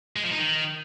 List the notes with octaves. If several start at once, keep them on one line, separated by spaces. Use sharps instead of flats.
G#3
F3
D#4
D#3